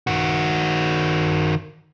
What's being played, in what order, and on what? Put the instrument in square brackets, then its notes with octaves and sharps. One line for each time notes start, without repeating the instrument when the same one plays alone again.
[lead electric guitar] D#3 F#4